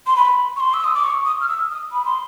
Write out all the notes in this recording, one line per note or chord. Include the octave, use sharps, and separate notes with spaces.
C6
B5
C#6
C6
E6
D#6
D6
C#6
D#6
F6
E6
D#6
B5
C6